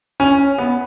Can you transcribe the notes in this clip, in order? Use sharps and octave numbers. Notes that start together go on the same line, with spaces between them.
C#4
B3